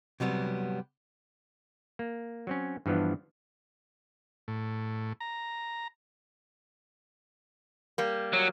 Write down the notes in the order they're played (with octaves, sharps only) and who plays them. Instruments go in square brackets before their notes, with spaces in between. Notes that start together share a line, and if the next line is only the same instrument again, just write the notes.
[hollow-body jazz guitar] C3 F#3 G3 B3
[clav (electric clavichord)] A#3
F#3 C4 C#4
G2 E3 F3 B3 D4
[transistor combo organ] A2
A#5
[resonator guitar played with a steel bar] G3 A#3
[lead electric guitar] F#3